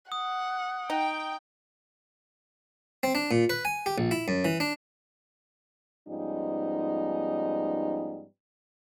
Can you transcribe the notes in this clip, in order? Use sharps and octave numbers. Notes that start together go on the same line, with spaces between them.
F#5 D#6
D#4 G5
C4
D4
A#2
B4
G#5
G4
A#1
E4
F#2
E3
D4
G#2 F3 G3 B3 C#4 D#4